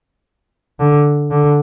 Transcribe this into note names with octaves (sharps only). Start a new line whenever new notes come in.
D3
D3